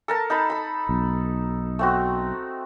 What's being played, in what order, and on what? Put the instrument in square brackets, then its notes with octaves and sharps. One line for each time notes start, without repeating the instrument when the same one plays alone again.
[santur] A4 A#4 A5
D#4 A5 B5
A4 B5
[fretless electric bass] B1
[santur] A3 C4 F#4